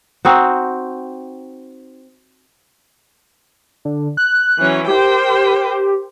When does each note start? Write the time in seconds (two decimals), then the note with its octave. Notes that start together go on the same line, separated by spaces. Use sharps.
0.25 C4 D#4 F#4
3.85 D3
4.17 F#6
4.58 E3 F#3 C#4
4.88 G4 A#4 C5 G5